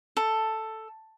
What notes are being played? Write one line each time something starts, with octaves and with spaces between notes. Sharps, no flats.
A4